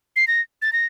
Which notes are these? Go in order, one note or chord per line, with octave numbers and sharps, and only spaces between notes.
C7
A#6
A6
A#6